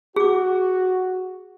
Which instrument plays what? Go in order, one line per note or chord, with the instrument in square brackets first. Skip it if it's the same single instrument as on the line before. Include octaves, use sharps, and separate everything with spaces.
[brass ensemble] F#4 [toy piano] G#4 D6